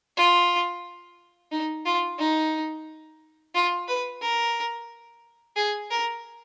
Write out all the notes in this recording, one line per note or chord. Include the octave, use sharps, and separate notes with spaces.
F4
D#4
F4
D#4
F4
B4
A#4
G#4
A#4